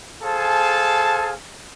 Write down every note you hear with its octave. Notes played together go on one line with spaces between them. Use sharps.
G#4 A4 C5 F5 G#5 A5